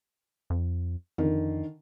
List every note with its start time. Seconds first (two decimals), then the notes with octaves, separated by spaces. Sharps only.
0.50 F2
1.18 F2 D3 D#3